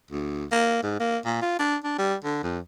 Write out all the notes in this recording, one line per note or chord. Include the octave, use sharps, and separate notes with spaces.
D2
A#3
G#2
A#3
A#2
F4
D4
D4
G3
D3
F2